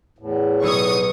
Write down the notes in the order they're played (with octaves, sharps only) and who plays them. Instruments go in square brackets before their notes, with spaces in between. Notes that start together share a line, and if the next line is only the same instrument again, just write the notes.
[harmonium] E2 A2
[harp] B1 C#5 E6 [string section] C#6 D#6